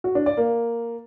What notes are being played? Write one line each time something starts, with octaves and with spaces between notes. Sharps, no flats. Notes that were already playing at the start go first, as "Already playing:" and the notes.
F#4
D4
D5
A#3